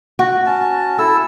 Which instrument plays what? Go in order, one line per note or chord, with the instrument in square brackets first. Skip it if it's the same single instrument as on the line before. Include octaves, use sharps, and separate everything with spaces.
[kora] F#4
[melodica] C#4 A5
[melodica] E4 E6 [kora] A4